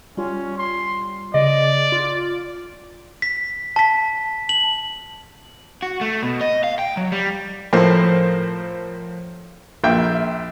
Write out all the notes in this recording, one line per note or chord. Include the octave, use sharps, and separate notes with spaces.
G3 C#4 F4
C6
C#3 D5 D#5
F4
B6
A5 B6
F#7
F#4
A3
B2
D#5
F5
G5
F#3
G3
A2 F3 A#4 C5
A#1 A#3 F4 E5 G5